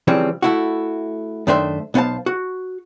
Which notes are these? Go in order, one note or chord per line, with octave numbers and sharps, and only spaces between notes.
C#3 E3 F3 G3 C4
A3 E4 F#4
F#2 D#3 A3 D4 C5 E5
B1 B3 C5 F5 A5
F#4